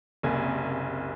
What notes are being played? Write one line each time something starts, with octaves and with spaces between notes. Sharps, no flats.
F#1 C2 A#3 G#5